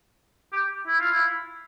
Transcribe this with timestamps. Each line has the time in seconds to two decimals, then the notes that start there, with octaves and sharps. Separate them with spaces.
0.53 G4
0.87 E4
1.00 F4
1.12 E4